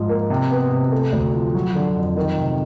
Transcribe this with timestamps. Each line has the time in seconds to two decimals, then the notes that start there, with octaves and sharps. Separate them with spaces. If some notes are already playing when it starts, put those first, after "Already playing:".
Already playing: G#2 F3
0.09 A#3
0.30 C3
0.51 B3
0.71 C3
0.92 A3
1.13 D2
1.34 F3
1.54 F#3
1.75 D3
1.96 F2
2.17 D#3
2.37 C3